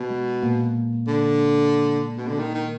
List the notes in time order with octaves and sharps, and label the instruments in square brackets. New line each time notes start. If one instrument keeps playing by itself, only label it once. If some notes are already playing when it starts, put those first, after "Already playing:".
Already playing: [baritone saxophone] B2
[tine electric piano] G#3
A#2 A#3
[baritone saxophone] D3
B2
D3
D#3
D#3